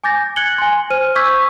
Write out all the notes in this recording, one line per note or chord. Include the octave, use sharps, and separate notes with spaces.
G#5 D6 G6 A6 A#6
F#6 G#6 C#7 F#7 G7
G#5 C6
C5 F6 D#7
C#6 D6 E6 G6 G#6 B6